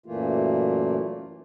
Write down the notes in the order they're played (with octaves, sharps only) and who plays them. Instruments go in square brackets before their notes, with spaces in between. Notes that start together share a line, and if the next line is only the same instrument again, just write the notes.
[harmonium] F#2 A#2 E3 A3 A#3 F4